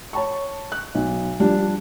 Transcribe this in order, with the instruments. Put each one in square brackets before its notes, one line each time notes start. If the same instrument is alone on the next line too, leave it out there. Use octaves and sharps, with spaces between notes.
[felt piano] C#5 A5 C#6
F#6
B1
F3 G3 D4